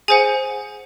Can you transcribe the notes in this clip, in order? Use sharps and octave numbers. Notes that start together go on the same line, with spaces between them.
G#4 C5 F#5 G#5